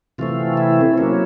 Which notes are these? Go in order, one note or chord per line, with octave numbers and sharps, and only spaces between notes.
C3 E3 A3 C4 F4
E4
F#3 A#3 C#4 E4